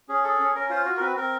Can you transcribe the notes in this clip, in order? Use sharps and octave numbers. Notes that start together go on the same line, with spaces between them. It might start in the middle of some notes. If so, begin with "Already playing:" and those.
C#4 G#4
G#4 A4
C#4
C#4 A#4
F4 C5
F#4
A#4
C4 B4
C4 A#4